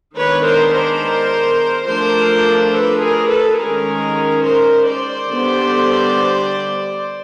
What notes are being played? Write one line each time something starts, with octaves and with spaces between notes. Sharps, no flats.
D#3 G#3 B3 D4 B4 C#5
A#4 C5
A#4 C5
F3 A3 D4 A#4 C5
A4 B4
G#4 A#4
A4 B4
D#3 G#3 C#4 G#4 A#4
A#4 C5
C5 D5
D3 G3 B3